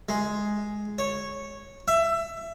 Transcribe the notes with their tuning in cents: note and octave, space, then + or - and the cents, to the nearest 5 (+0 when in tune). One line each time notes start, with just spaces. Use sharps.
G#3 +5
C#5 -10
E5 +20